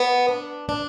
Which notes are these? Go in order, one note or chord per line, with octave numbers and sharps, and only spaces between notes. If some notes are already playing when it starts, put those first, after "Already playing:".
Already playing: B3
D4
D4